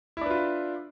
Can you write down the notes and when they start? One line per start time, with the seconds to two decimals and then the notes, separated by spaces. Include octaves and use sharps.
0.17 E4
0.21 D4
0.26 B4
0.30 F4